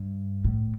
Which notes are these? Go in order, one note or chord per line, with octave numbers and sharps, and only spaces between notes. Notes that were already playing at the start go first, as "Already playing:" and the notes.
Already playing: G2
A2